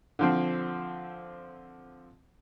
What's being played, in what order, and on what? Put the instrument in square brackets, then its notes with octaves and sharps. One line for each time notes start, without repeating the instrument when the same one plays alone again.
[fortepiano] D3 F3 C4